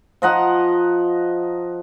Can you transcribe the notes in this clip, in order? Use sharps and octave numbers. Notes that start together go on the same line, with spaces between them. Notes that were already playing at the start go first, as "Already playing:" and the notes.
F3 D#5 F#5 A#5